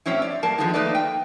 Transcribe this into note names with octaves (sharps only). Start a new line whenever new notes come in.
A2 F#3 C4 C#4 E4
D5
G2 A#3 A#4 A5
D3 D#3 F3 G#3 B3 D#4
A3 A#3 D#4 B4 D5 D#5
G5